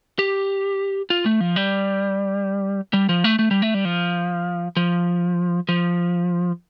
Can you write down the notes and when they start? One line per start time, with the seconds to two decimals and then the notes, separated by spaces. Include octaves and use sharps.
0.19 G4
1.10 F4
1.26 A3
1.40 F3
1.56 G3
2.93 G3
3.09 F3
3.24 A3
3.39 A3
3.51 G3
3.62 A3
3.74 G3
3.85 F3
4.77 F3
5.69 F3